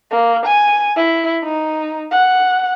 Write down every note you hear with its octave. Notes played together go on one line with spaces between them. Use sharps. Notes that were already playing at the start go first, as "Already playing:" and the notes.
A#3
G#5
E4
D#4
F#5